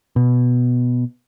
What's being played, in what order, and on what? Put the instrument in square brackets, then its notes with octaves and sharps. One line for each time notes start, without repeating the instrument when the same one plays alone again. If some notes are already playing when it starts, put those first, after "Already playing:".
[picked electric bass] B2